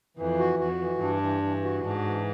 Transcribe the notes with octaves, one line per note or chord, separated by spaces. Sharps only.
F2 E3
F#4
F2 F#4
E3
G2 D4
E3
E3
F#4
G#2 D4
E3